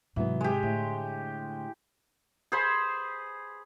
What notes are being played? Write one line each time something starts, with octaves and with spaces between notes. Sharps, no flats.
G#2 C3 E3 F#3 B3
G#3 G4
A2 D3
G#4 C5 B5